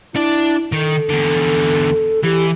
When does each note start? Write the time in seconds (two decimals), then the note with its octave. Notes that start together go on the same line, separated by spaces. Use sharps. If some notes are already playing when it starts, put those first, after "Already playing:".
0.16 D4 E4 D5
0.73 D#3 A4
1.10 E2 D3
2.24 E3 G4